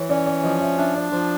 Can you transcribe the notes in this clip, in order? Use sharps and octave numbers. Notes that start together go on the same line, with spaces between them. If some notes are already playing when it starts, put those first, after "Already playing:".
Already playing: E3 C#5
C#4 D5
D5
F3 D#5
E5
D4 E5
D5
F3 C5